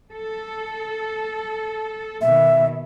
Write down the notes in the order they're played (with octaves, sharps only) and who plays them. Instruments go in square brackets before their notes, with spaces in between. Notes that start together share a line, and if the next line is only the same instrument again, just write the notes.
[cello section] A4
[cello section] B2 D#3 [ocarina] E5